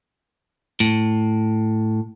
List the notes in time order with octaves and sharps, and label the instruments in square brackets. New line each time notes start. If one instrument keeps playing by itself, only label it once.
[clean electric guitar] A2